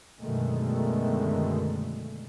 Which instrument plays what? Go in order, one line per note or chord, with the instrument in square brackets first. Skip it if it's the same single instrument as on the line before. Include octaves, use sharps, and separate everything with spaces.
[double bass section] F#2 B2 D3 D#3 G#3 A3